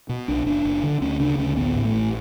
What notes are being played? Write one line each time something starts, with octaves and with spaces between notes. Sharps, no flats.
B2
B1 D4
F#1 D4
F#1
D3
D2 C#4
C#3 D4
D2 C#4
A1 B3
A2
A3
A1